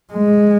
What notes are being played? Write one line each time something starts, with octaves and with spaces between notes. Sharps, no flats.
G#3